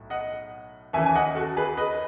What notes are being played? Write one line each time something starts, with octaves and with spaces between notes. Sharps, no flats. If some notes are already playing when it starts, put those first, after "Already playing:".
Already playing: B1 A2
D#5 F#5
D#2 C#3 E3 E5 G#5
G#5
D#5 F#5
F#4 A4
G#4 B4
B4 D#5